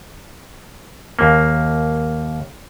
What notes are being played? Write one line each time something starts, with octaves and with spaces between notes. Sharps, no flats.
D#2 A#3